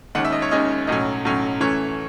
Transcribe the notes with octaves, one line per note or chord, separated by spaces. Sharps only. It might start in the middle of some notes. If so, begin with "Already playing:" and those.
D#2 D#3 G#3 C#4 F#5
E5
D#5
C#5
D#2 D#3 G#3 C#4 D#5
B1 A2 F#3 C#4 D#5
B1 A2 F#3 C#4
F#2 E3 A3 C#4 C#5